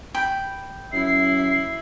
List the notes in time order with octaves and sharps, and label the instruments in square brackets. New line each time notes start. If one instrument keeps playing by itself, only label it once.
[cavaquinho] G5 B5
[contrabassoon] F#2 [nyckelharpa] E4 [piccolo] C7